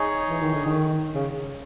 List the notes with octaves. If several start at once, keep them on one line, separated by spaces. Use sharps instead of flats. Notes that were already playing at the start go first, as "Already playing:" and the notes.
Already playing: D#4 G#4 C#5
E3
D#3
D3
D#3
C#3